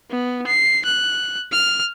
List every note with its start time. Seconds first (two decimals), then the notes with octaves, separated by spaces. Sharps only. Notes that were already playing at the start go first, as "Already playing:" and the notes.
0.11 B3
0.47 C7
0.85 F#6
1.52 F6